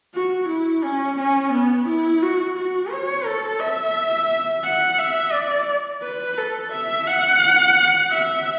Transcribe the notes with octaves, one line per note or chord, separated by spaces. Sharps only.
F#4
E4
C#4
C#4
B3
E4
F#4
F#4
C#5
A4
E5
F#5
E5
D5
B4
A4
E5
F#5
E5